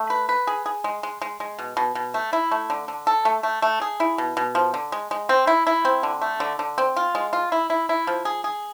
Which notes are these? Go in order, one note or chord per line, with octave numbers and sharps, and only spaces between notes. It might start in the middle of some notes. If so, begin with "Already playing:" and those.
Already playing: A3
B4
B4
G#4
G#4
G#3
G#3
G#3
G#3
B2
B2
B2
A3
E4
A3
D3
D3
A4
A3
A3
A3
G#4
E4
B2
B2
F3
D3
G#3
G#3
C4
E4
E4
C4
D3
A3
D3
D3
C4
F4
G#3
F4
E4
E4
E4
F3
G#4
G#4